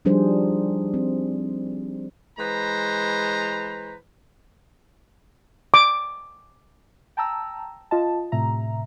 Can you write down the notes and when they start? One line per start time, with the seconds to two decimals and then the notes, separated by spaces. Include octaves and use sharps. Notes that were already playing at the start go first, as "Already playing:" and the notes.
0.05 F3 G3 D4 D#4 G#4 C5
0.94 C4
2.38 E3 G#3 B4 C5 A#5
5.74 D6
7.17 G5 A5 A#5 E6
7.91 F4 D#5 A5
8.32 A2 C3 E5 A#5